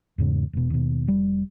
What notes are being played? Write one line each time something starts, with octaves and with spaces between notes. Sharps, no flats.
E2 G#2 C#3
E1 B2
D#2 B2
F1 G3